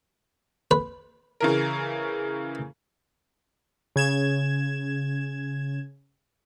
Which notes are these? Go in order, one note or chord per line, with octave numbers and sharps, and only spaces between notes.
B4
C#3 E3 A#4
C#3 G#6 E7